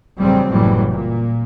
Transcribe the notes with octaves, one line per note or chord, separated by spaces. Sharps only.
A1 G2 C#3 F#3 G3 C4
F#1 A2 E3 F#3 G3
A#2